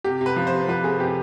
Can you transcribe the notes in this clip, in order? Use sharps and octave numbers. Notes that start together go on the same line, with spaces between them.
C3 G4
C3
B4
F3
C5
C3
F3 B4
C3 G#4
C3 G4